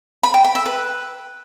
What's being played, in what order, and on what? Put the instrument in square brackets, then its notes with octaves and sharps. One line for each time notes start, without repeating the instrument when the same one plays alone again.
[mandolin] B5
G5
B5
E5
B4